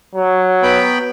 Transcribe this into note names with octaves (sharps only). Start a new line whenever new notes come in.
F#3
B3 G5 B5